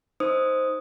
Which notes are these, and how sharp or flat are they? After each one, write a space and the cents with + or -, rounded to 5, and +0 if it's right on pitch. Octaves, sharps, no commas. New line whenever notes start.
D#4 +5 C5 +0 D#6 +0